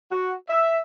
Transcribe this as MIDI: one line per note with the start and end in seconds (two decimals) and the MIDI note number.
0.10 0.34 66
0.48 0.76 76